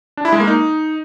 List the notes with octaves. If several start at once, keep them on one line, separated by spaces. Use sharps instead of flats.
D4
E4
G#3
A#3
D#4